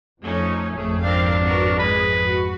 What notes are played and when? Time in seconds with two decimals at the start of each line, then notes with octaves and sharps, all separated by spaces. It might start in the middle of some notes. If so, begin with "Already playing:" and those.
0.22 F2 F3 A3 C#4 D#4
0.75 G#1 F2 A3 G#4
1.04 C4 D4 A#4 F5
1.44 F#4 A#4 B4
1.79 G#3 B4 D#5
2.27 F#4